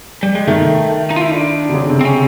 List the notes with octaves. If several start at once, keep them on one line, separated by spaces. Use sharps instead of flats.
G3
G#3
D#3 A3
D#4
F4
E4
D4
D3
C#3
C3
C4
C#4